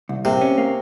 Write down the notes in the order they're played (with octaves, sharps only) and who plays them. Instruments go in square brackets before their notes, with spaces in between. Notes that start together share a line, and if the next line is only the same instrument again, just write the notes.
[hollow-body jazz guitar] C2
[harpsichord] C3 [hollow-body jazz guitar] A#3
[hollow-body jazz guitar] C#4
A#3